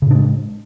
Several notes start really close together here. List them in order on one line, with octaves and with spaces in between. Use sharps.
C#3 A2 D4 G#3